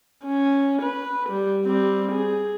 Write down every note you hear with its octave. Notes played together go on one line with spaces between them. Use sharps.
C#4
B4
G3
G3 C4
G#4